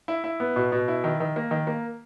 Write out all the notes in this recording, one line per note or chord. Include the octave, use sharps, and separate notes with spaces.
E4
E4
B3
B2
B2
E4
D#3
D#3
A#3
D#3
A#3